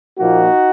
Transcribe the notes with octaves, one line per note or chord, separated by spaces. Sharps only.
A#2 F3 A#3 D#4 F#4